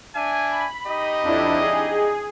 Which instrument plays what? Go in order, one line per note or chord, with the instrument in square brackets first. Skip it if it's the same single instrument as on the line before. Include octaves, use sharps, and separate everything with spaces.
[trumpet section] D4 E5 G#5
[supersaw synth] B5
[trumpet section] D#4 G4 D#5
[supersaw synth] F2 D4 E4
G#4